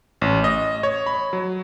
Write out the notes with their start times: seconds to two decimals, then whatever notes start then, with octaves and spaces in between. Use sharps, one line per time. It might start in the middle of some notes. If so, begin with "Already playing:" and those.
0.21 A1
0.44 D#5
0.83 C#5
1.06 B5
1.33 F#3